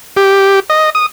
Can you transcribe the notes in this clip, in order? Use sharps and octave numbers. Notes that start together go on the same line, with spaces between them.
G4
D#5
D#6